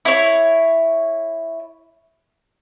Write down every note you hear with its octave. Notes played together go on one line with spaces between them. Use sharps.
E4 C#5